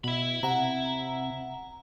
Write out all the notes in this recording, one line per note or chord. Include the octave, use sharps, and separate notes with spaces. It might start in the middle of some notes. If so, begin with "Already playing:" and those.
B2 E5 B5
C3 F#5 A#5